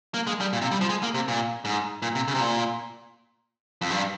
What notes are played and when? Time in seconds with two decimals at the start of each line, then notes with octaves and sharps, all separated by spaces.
0.14 A#3
0.27 G#3
0.41 G3
0.53 A#2
0.62 C3
0.71 G3
0.81 F3
0.89 G#3
1.03 A#3
1.14 C3
1.28 A#2
1.65 G#2
2.02 A#2
2.15 C3
2.28 C#3
2.35 C3
2.40 A#2
3.81 F2
3.90 G2